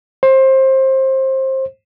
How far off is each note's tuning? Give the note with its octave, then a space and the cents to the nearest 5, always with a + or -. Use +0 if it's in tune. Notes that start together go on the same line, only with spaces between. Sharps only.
C5 +20